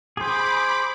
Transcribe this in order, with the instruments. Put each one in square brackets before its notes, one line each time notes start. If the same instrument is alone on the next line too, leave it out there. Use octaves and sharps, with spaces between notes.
[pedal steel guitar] G#4 C5 [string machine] B5 D6